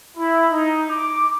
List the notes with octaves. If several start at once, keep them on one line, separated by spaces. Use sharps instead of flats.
E4
D#4
D6